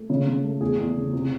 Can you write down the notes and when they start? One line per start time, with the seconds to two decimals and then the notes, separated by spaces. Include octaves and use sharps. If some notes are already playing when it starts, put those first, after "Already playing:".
Already playing: A3
0.10 C#3
0.27 C#3
0.44 A3
0.61 E2 G#4
0.78 E2
0.96 C#3
1.13 C3